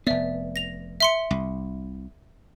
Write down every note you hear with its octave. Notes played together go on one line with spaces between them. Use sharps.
F1 B3 D5 E5
A#6 F7
E5 C6 C#7
C2